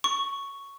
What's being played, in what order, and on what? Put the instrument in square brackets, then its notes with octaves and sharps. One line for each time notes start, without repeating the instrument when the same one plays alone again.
[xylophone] C#6